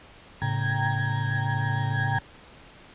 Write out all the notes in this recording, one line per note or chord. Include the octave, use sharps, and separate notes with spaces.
A2 C#3 G5 A#5 G#6